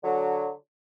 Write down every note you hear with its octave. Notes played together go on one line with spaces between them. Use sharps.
D3 F#3